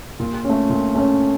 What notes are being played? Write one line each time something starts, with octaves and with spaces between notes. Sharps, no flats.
A#2
A3 C#4
A#2
A3 C#4